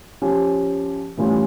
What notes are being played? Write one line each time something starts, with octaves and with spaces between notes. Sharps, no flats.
F3 C#4 G4
A2 E3 G3 C#4 F4